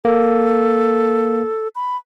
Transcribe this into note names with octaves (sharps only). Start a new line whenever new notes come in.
A#3 A4
B5